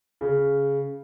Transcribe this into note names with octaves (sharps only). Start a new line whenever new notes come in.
C#3